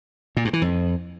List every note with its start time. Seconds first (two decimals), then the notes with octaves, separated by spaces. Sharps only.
0.37 A#2
0.45 G2
0.53 E3
0.62 F2